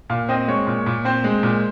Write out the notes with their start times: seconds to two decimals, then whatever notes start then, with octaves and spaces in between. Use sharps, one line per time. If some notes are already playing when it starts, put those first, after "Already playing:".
0.10 A#2 F5
0.29 C4 D#5
0.48 G#3 C#5
0.67 A#2
0.86 A#2
1.05 C4 C5
1.24 G#3
1.43 A#2